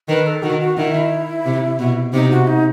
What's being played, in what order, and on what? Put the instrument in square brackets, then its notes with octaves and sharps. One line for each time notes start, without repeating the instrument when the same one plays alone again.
[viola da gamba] D#3 [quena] B4
[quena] A4
[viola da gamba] D#3 [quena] F#4
[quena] F#4
[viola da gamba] D#3 [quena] E4
[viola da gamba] C3
B2
[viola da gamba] C3 [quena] D#4
[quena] F#4
D#4